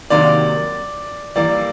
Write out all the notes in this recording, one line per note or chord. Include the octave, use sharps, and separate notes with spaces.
C3 D#3 F#3 A#3 D5
E3 G3 A#3 D5